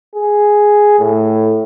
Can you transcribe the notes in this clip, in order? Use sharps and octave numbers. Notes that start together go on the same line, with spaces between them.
G#4
A2